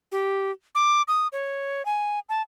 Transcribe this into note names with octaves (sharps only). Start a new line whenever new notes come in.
G4
D6
D#6
C#5
G#5
A5